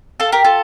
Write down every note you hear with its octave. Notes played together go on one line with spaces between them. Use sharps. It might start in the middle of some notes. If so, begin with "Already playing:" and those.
F4 A4
G4 A#4
F4 A4